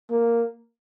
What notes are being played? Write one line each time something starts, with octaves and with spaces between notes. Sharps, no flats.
A#3